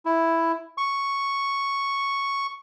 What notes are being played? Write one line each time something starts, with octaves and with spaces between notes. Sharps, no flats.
E4
C#6